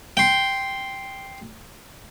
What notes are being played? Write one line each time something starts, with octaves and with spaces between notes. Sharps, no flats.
G5 C6